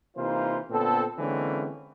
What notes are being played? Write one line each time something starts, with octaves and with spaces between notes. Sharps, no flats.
C3 E3 A#3 D#4 F4 C5
A#2 D3 B3 C4 A4
D3 E3 G#3 A#3 C4 C#4